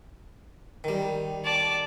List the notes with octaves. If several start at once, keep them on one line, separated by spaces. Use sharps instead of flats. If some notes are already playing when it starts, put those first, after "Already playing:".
D#3 G3
D5 A5